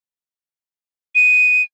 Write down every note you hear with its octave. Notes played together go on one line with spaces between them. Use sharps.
D#7